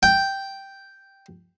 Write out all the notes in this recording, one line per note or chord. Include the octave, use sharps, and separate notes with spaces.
G5